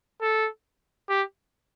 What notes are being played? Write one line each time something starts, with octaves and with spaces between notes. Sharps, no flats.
A4
G4